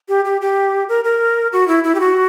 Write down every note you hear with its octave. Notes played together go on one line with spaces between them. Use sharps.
G4
G4
G4
A#4
A#4
F#4
E4
E4
G4
F#4